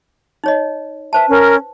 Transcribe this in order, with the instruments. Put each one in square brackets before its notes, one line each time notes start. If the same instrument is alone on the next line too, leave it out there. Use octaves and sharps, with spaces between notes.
[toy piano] D#4 C#5 D#5
[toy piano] B4 C5 A5 [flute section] E5
[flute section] C#4 A#4